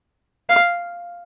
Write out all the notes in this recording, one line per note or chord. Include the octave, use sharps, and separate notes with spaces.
F5